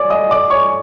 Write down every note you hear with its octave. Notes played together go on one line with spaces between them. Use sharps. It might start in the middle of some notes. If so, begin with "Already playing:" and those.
Already playing: C#5 D5 D6
D#5 D#6
D5 D6
C#5 C#6